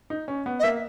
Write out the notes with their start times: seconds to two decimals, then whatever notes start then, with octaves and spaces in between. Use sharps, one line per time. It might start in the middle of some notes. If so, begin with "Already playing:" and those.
0.10 D#4
0.28 C#4
0.46 B3
0.60 D#5
0.63 A#3 E5